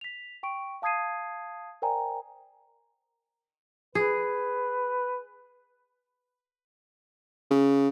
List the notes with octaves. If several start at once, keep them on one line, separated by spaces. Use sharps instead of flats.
B6 F7
G5 C#6 D7
F5 A5 D#6 G#6 C7 D#7
A#4 C5 D5 G5 G#5 A#5
G#4 B4
C#3